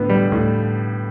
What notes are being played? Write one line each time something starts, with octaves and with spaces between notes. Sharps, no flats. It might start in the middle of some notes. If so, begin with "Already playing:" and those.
Already playing: A2 D3 B3
G3
A2